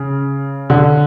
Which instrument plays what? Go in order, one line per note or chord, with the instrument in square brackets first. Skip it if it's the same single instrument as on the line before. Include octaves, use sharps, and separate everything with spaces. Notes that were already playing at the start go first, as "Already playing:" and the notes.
Already playing: [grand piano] C#3
D3